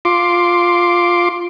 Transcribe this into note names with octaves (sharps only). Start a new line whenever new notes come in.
F4 C6 D6